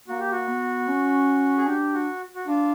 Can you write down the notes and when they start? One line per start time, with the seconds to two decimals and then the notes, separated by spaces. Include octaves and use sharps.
0.08 A#3 F#4
0.19 G4
0.31 F#4
0.48 B3
0.88 C#4
1.58 G#4
1.66 D4 G4
1.94 F#4
2.35 F#4
2.47 D4 F4